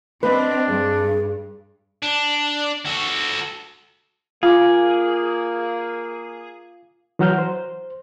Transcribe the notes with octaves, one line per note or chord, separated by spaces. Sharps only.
C4 D4 B4 D#5
G2 G#4
D4
F#4 A4
A#3 F4 G#4 F5 D6
E3 F#3 F#5 A#5 F6 G6
C5